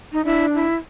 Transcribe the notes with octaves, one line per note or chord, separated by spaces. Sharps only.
D#4
D4 E4
E4